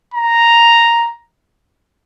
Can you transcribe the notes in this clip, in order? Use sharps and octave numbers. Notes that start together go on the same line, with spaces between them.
A#5